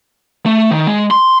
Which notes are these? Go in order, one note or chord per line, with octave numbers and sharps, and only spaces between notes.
A3
D#3
G#3
C6